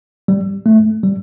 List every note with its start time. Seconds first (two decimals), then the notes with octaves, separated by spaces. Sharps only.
0.28 G3
0.66 A3
1.03 G3